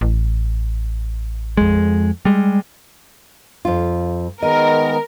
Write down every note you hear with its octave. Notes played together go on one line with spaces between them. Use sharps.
A1
F2 G#3
G3 G#3
F2 F4
D#3 G#3 B3 A#4 D#5